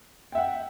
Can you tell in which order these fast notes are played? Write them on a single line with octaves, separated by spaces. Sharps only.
G5 E5 F#5